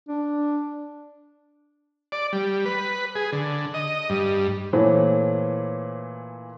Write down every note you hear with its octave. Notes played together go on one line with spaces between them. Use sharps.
D4
D5
G3
B4
G#4
D3
D#5
G2
A#2 E3 A3 C5 C#5